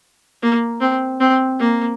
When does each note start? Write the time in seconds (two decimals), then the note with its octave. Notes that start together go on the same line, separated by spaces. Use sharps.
0.42 A#3
0.81 C4
1.21 C4
1.59 A#3